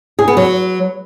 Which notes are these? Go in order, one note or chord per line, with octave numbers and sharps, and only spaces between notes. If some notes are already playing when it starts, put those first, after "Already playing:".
G#4
B3
F#3